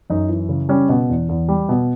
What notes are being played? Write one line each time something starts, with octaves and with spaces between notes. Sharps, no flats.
F#2 D#4
E3
C#3
G3 C#4
B2
E2
E2
G3
B2